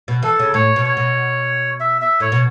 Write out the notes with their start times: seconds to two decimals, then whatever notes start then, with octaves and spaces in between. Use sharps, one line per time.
0.08 B2
0.23 E3 A4
0.39 C#3
0.54 A2 C#5
0.76 B2
0.86 C#5
0.97 B2
1.80 E5
2.02 E5
2.20 A2 C#5
2.32 B2